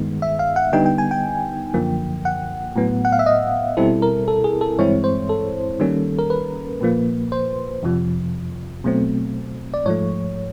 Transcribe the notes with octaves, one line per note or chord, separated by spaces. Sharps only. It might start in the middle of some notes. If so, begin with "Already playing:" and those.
Already playing: G2 D#3 G#3 B3
E5
F5
F#5
D3 G3 B3 D#4 G5
G5
G#5
G5
F#2 D3 F3 A#3
F#5
A2 F#3 B3
F#5
F5
E5
D#5
B2 G3 C4 E4 A4
A#4
A4
G#4
A4
G2 E3 G#3 C4 E4 C#5
C5
A4
D#3 G3 A#3 C#4
A#4
B4
A#2 F3 A#3
C5
F2 C3 F3
B2 F#3 A3 C4
D5
G#2 F3 A3 C#5